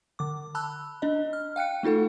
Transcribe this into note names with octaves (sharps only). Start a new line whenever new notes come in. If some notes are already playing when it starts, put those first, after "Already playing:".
D3 D6
A5 B5 E6 F#6
D4 D#5
F6
F5 G5 F#6 C#7
A3 D#4 F4 A4 F#5